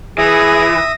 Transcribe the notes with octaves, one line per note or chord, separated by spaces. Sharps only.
E3 G#4 E5 D#6 A#6